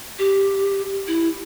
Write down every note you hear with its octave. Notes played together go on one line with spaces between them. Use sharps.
G4
E4